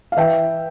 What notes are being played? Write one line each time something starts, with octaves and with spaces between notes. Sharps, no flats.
F5
E3 E5 G5